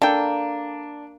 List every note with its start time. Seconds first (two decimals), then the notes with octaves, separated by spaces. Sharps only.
0.02 A#3 D4 A4 G5